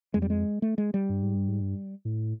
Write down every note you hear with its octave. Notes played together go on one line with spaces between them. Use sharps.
F2 G#3
G3
G#3
A3
G#3
G3
G2
G#2
G2
G#2
G2
A2